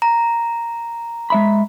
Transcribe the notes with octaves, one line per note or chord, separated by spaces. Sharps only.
A#5
G#3 E5 B5